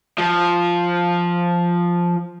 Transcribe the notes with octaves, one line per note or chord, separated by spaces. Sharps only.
F3